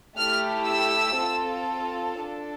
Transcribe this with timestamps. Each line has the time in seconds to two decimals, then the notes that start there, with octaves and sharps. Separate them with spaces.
0.17 A3 E4 G4 F6
0.68 E6
1.19 C4 F4 A4
2.21 D4 A4